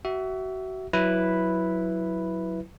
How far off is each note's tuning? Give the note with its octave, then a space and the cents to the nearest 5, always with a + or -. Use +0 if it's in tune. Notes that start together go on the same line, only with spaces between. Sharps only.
F#4 +30 E5 +0
F#3 +0 E4 +0 B4 +0